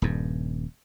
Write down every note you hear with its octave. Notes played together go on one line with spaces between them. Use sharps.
D#1 G2